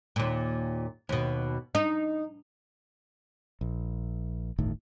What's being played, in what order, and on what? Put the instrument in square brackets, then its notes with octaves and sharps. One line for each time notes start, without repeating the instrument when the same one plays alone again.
[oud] D#2 A#2
D#2 B2
D#4
[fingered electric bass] A#1
D1 G1 A2 D#3